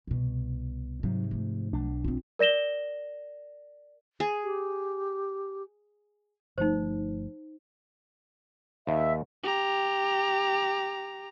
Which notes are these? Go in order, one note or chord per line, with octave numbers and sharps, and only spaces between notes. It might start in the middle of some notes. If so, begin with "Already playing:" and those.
C2 B2
G#2 C3 F#3 D#4
F3 A3
B1 D4
C4 F4
A#4 D5 A#6 E7 G7
G#4
G4
G1 F3 A3 D#4 C5
D#2 E5
G4 A#5